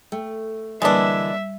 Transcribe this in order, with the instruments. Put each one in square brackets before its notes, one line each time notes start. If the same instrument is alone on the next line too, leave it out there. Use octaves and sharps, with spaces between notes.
[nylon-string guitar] A3 [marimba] G5
[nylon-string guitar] D3 E3 A#3 [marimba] G3 [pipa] G#3 D4 [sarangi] E5